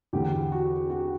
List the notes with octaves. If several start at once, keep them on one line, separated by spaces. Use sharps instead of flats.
E2 D3 G4
G4
F#4
F#4